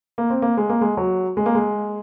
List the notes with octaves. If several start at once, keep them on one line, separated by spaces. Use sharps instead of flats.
A#3
C4
A#3
G#3
A#3
G#3
F#3
G#3
A#3
G#3